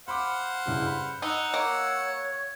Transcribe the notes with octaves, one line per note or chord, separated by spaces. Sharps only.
C5 F5 F#5 B5 D6
G2 C#3 E4
B5
D#4 F#5 E6
A#3 C#5